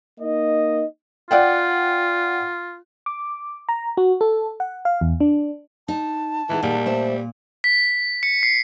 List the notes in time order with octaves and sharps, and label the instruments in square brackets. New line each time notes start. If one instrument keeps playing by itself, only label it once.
[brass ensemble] A#3 D#4 D#5
[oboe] F4 [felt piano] D5 F#5 G5
[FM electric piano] D6
A#5
F#4
A4
F#5
F5
E2
D4
[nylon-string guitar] D#4 [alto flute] A5
[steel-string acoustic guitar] D#3 G#4 F#5 [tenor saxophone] E3
[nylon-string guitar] A#2 [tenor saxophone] G3
[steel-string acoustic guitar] A3 C5 E5
[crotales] B6
C#7
C7